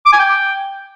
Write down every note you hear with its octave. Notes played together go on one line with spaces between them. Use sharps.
D6
G#5
G5